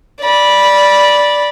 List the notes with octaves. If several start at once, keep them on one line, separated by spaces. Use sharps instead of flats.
D5 B5